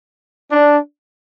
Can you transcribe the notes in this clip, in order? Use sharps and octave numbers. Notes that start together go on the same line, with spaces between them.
D4